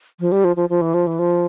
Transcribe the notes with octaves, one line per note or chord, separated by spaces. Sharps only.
F3
G3
F3
F3
F3
E3
F3
E3
F3